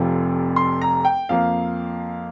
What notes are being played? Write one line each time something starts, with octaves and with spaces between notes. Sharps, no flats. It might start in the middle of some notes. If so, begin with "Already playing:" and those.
Already playing: F1 F2 C3 F3
C6
A#5
G5
F2 F3 A#3 F5